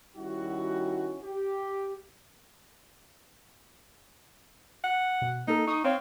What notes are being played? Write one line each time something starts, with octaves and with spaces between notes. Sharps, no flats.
D#3 G3 C#4 E4 F#4
G4
F#5
B2
A#3 D#4 A4
D#4 C#6 D#6
C4 C#5 F5